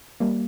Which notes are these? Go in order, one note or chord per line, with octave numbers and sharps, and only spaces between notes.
G3 A#3